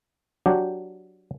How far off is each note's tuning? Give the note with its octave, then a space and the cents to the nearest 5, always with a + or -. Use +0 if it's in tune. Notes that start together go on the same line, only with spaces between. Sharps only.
F#3 +0 D4 +0 G4 +0